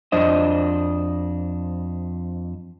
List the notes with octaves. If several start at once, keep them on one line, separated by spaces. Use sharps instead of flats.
F2 D4 C5 D#5